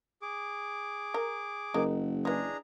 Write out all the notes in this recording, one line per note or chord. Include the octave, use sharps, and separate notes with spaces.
G#4 D6
A#4
F#1 G#3 A#3 D#4
E3 G#3 D4 G#4 A#5